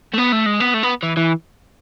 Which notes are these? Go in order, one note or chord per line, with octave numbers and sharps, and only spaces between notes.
A3
B3
A3
G#3
B3
A3
B3
E3
E3